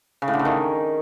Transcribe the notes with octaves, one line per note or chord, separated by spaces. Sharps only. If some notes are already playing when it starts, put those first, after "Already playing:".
C#3
A2
D3
C#3
D#3